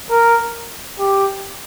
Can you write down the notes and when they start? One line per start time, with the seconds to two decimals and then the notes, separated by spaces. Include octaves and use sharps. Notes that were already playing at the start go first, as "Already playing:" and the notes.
0.10 A#4
0.99 G4